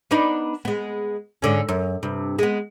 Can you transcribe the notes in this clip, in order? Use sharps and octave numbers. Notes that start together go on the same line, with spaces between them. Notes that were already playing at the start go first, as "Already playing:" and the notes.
B3 D4 D#4
G#3 B3
G#2 D3 C#4
F#2
G2 C3
G#3 B3